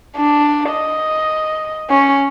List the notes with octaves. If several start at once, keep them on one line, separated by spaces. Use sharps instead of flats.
D4
D#5
C#4